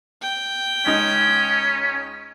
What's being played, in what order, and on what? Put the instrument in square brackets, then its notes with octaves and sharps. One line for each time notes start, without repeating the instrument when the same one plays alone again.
[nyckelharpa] G5
[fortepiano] C#2 D#4 [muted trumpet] C#4